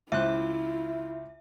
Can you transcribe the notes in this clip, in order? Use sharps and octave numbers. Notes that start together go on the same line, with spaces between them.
C#2 E4 F4 C5 E5 F#6